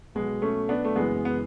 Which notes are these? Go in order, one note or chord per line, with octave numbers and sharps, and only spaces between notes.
B1 B2 F#3 G#3 B3
A3 C#4
B3 D4
A3
F#1 F#2 E3 G#3 B3
B3